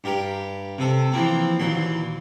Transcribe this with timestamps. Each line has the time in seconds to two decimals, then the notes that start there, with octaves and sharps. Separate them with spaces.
0.04 G2 G4 A#4
0.78 C3 A4
1.12 E3 F3 A#3 C4
1.60 D#2 A#2 E3 F#3 C6